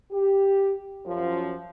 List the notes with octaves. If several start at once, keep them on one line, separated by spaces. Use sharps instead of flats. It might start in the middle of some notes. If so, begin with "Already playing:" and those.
G4
F#2 F3